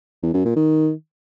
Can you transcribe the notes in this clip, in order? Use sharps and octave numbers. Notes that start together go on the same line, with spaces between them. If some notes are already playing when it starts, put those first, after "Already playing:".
E2
F#2
A#2
D#3